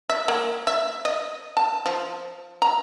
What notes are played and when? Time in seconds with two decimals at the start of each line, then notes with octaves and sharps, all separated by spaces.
0.10 E5
0.28 A#3
0.67 E5
1.05 D#5
1.57 A5
1.86 F3
2.62 A#5